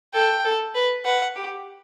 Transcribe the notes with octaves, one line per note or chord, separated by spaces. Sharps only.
A4 G5
A4
B4
B4 F#5
G4